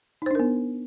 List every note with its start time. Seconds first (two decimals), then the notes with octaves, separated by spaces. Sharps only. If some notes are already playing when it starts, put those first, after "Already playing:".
0.22 D#4
0.26 C5
0.31 D4
0.35 A#4
0.39 B3